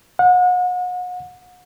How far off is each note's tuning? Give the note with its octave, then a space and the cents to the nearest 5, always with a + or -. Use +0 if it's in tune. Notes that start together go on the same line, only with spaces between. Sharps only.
F#5 -35